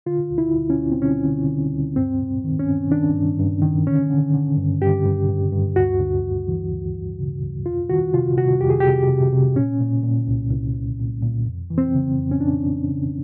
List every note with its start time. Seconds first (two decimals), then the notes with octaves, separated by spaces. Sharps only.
0.06 D3 F4
0.30 D2
0.38 E4
0.55 D2
0.70 C#4
0.78 D2
0.92 C4
1.02 D3 C#4
1.25 D3
1.49 D3
1.72 D2
1.96 G2 C4
2.21 G2
2.44 D#3
2.59 C#4
2.67 G2
2.91 D#3 D4
3.15 G2
3.40 G2
3.62 D#3
3.87 D3 C#4
4.10 D3
4.34 D3
4.57 G2
4.82 G2 G4
5.05 G2
5.28 G2
5.52 G2
5.76 D2 F#4
6.00 D2
6.24 D2
6.48 E3
6.72 D2
6.94 D2
7.19 C#3
7.43 D2
7.66 F2 F4
7.90 D#3 F#4
8.14 C3 F4
8.37 C3 F#4
8.61 F2 G4
8.70 G#4
8.80 C3 G4
9.09 C3
9.33 C3
9.56 A#2 C#4
9.81 A#2
10.03 A#2
10.28 C2
10.51 C2
10.75 C2
10.99 A#2
11.22 A#2
11.46 F2
11.70 E3
11.78 C4
11.94 C#3
12.18 F2
12.31 C#4
12.41 F2 D4
12.65 F2
12.89 C#3